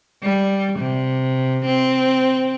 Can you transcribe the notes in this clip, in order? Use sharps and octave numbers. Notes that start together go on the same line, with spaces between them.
G3
C3
C4